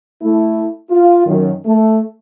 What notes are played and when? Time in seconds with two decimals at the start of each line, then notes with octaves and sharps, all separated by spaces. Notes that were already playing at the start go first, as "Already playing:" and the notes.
0.22 A3 E4
0.90 F4
1.27 F#2 D#3
1.66 A3